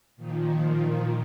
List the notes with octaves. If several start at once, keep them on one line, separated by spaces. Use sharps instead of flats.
A#2 D#3 F3